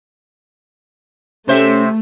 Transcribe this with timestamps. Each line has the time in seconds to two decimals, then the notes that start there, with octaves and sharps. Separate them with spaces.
1.48 C3 A3 C#4 C5 E5